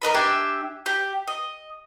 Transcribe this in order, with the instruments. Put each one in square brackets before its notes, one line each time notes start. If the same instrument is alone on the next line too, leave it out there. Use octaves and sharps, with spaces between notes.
[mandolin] A#4 B4 D#5 B5
D4 G4 E5 G#5
G4
D#5